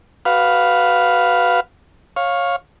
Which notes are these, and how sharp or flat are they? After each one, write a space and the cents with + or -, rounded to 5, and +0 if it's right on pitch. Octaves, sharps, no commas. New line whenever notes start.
F#4 +25 B4 +0 F5 +0
C#5 -10 F5 +10